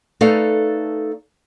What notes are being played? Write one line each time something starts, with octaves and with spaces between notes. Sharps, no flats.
A3 D#4 A4 B4 D5 F5